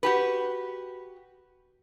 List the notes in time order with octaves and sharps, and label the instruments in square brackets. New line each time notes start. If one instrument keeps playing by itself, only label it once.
[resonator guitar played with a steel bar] F#4 G4 B4